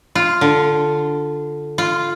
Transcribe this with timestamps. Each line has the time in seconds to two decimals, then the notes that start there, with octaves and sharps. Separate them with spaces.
0.15 F4
0.41 D3
1.78 F4